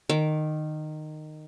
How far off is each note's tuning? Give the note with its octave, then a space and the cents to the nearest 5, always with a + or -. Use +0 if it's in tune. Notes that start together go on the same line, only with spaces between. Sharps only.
D#3 -15 D6 -20